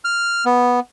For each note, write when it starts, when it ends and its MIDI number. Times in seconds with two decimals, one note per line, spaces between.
0.05 0.45 89
0.46 0.80 59